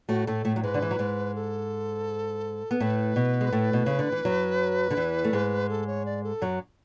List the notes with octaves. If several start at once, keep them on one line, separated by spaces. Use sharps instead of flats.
A2 A3 F#4
A2 A3 A4
A2 A3
F#3
G#2 G#3 B4
D3
E3
F#3
G#2 G#3
A4
B3
A2 A3 B4
B2 B3
G#3
A2 A3
B2
C#3
D3
E3
F#2 F#3
D3
E2 E3
A3
G#2 G#3
A4
C#5
D5
A4
F#2 F#3